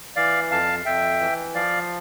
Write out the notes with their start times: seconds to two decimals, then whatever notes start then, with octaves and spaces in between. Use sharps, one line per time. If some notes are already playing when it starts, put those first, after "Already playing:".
0.16 E3 D5 F5
0.51 F2 F5 A5
0.85 F2 E5 G5
1.20 E3
1.54 F3 D5 F5